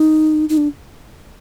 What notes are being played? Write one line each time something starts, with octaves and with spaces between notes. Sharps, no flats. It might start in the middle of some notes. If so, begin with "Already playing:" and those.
Already playing: D#4
D#4
D4